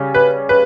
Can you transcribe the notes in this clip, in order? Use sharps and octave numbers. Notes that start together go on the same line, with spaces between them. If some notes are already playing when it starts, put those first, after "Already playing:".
Already playing: C#3 G3 C#4
B4
B4